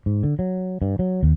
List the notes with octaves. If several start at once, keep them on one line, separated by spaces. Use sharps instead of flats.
G#2
D3
F#3
G2
F#3
D#2